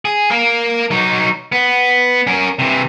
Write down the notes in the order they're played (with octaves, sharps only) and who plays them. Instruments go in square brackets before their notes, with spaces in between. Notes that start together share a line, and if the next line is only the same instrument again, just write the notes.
[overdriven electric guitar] G#4
A#3 A#4
F#3 D#4
B3
C#4 A#4
C3 E3